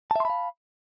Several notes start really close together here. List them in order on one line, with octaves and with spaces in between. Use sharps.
A5 E5 C6 B5 F5